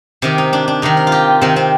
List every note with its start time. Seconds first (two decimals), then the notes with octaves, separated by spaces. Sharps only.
0.22 C3 D#3 G4
0.38 D#4
0.53 D4
0.68 D4
0.82 C3 D#3 D#4
0.97 A#4
1.07 F4
1.12 G4
1.41 C3 D#3 C4
1.56 C4